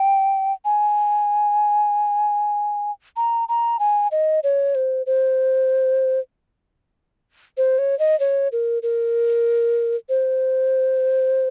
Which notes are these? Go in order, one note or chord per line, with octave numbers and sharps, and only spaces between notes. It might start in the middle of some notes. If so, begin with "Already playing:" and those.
Already playing: G5
G#5
A#5
A#5
G#5
D#5
C#5
C5
C5
C5
C#5
D#5
C#5
A#4
A#4
C5